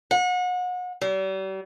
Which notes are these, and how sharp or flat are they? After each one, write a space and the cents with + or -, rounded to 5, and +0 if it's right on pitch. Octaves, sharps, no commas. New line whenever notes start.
F#5 -35
G3 -40